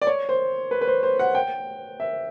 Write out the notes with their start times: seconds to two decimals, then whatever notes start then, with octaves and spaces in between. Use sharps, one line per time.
0.02 D5
0.07 C#5
0.29 C5
0.71 B4
0.81 B4
0.88 C5
1.03 C5
1.19 F#5
1.35 G5
2.00 E5